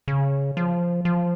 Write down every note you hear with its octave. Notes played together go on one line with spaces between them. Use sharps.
C#3
F3
F3